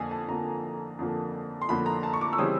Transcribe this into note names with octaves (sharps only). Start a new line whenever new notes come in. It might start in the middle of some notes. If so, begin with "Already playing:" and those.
Already playing: F2 D3 F3 A#3 G#5
A5
F2 D3 F3 A#3 A#5
F2 D3 F3 A#3
C6
F2 D3 F3 A#3 B5
A#5
A5
C#6
D6
E6
C#3 E3 G3 C4 D#6